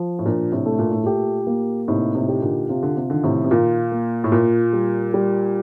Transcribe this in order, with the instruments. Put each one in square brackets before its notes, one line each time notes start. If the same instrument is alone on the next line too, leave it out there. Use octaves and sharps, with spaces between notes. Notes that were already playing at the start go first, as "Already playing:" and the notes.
Already playing: [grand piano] F3
[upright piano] A2
[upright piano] A#2 [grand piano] D4
[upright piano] A2 C3
[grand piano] A3
[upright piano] A#2
A2
[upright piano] A#2 [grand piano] G4
[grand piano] A#3
[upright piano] A2 C3 [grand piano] D#4
[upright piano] A2 C3
[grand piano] G4
[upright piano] A#2 D3
[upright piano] C3 [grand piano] F4
[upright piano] D3
C3
[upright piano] D3 [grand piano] D#3
[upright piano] A2 C3
C3
[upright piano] A#2 [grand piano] F4
[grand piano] A#3
[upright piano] A2
[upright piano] A#2 [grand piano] F4
[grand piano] G3
G3